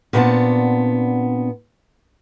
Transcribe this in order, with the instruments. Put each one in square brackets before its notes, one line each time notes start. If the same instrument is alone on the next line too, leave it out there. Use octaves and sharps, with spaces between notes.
[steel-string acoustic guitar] A#2 B3 C4 D4 F#5 A5